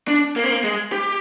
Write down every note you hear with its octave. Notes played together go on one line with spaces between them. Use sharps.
D4
A#3
C4
A#3
G#3
G4